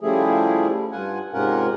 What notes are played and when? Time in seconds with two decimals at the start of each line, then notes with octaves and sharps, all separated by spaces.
0.01 C#3 F3 G3 A3 E4 G#4
0.92 G2 F4 F#5 G#5
1.33 G#2 C3 C#4 F4 A#4 F#5